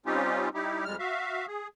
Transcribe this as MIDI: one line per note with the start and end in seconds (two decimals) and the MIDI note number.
0.06 0.49 55
0.06 0.49 60
0.06 0.49 61
0.06 0.49 63
0.06 0.49 65
0.06 0.49 67
0.54 0.85 55
0.54 0.85 63
0.54 0.85 64
0.54 0.85 67
0.85 0.96 41
0.85 0.96 55
0.85 0.96 56
0.85 0.96 89
0.99 1.46 66
0.99 1.46 76
0.99 1.46 77
1.47 1.68 68